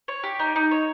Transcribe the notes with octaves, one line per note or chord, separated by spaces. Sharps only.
C#5
G4
D#4
D#4
C#5